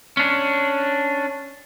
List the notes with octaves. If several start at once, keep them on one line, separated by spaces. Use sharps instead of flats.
C#4 D4